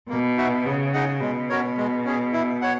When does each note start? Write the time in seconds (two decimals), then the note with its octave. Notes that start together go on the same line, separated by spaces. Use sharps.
0.09 B2 A#3
0.37 D#4 F#4 B4 E5
0.65 C#3 B3
0.93 D#4 G#4 D#5 F#5
1.21 B2 G#3
1.49 C#4 F#4 A#4 C#5
1.77 G#3
2.05 C#4 G#4
2.33 E4
2.61 C#5 F#5